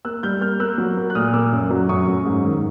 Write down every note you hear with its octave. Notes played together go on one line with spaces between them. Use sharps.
A#3 E6 F#6
G3 F6 G6
A#3 F6 G6
A#3 E6 F#6
F#3
A#3
F#6
A#2 D#6 F6
A#3 D6 E6
F#2
F#3
F#2 C#6 D#6
F#2
G#2
D#3